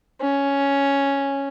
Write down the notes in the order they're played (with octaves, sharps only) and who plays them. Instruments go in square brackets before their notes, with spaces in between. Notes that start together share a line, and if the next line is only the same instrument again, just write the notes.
[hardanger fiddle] C#4